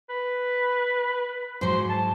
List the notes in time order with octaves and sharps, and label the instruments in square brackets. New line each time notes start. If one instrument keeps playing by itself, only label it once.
[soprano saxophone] B4
[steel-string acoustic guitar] G#2 F#3 [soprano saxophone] C5
[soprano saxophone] A5